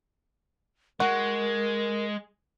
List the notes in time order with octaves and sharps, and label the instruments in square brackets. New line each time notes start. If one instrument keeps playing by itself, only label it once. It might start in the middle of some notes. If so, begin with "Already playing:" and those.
[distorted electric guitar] G#3 [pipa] F#4 [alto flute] A#4